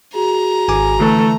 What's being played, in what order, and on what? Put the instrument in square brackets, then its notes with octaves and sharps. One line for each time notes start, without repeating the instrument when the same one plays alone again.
[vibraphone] F#4 G#4 [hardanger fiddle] A#5
[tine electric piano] G#1 G#5 D6
[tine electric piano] D3 E3 [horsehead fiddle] A3